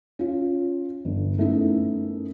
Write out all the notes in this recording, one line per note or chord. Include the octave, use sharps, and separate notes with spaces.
C#4 F4
G1
F#2 A3 B3 D#4 E4